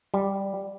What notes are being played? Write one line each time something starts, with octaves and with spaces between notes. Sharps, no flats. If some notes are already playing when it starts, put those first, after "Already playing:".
G3